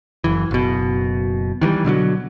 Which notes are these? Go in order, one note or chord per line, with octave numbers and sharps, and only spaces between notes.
F#1 E3
F#1 B2
D#3 E3 F#3 G3
B2 D3 F3 F#3